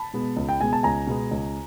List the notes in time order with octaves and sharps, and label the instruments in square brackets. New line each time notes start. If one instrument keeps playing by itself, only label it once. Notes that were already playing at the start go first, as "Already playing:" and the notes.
Already playing: [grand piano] A5 B5
B2 G#3 B3
C#2
G5
B2 G#3 B3 G#5
A5
C#2 G#5 A#5
B2 G#3 B3
C#2